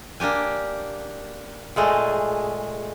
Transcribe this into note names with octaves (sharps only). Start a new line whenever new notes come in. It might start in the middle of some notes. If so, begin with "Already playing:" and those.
A#3 D4 G4 G#5
A#2 G#3 A3 G#4